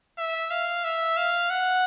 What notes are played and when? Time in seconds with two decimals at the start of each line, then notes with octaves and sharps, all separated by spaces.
0.18 E5
0.51 F5
0.84 E5
1.17 F5
1.50 F#5